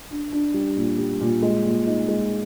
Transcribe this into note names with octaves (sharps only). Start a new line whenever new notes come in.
D4
D4
G3
A#2
G3
A#2
G#3
A#2
D#4
G#3